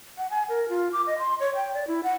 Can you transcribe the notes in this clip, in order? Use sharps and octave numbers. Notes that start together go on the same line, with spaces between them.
F#5
G#5
A#4
F4
D6
D#5
C6
C#5
G5
D5
E4
F#5